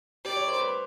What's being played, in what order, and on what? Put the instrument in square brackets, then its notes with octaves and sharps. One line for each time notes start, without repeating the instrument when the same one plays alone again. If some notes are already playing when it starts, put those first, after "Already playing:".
[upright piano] G4 [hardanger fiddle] D5
[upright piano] C#5
C5
B4